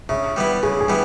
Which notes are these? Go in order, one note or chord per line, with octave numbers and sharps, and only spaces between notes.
C#3 E5
G3 B3 E4
C#3 G#4
G#4
G3 B3 E4